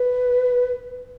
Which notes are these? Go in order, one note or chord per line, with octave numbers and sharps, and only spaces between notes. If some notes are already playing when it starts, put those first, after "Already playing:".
Already playing: B4